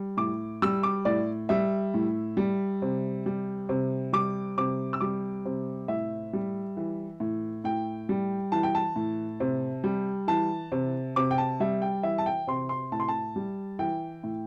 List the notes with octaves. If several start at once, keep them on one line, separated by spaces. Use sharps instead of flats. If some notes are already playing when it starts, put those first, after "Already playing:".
Already playing: G3
A2 D6
G3 E6
D6
A2 D5
G3 E5
A2
G3
C3
G3
C3
G3 D6
C3 D6
E6
G3 D6
C3
A2 E5
G3
E3
A2
A2 G5
G3
E3 A5
G5
A5
A2
C3
G3
E3 A5
C3
C3 D6
G5
A5
G3 E5
G5
E3 E5
A5
G5
C3 C6
C6
A2 A5
C6
A5
G3
E3 G5
A2